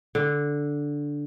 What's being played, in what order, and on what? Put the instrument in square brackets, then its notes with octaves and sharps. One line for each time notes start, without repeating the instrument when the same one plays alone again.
[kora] D3